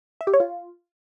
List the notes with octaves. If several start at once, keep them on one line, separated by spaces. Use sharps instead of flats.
E5
G4
C#5
F4